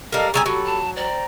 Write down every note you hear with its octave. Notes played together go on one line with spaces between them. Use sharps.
G3 A4 A#4 D#5 F5
C#3 G3 G#5 A#5 D#6 E6
F#3 F#4 G4 A4 B5
A5
C5 D5 G5 A#5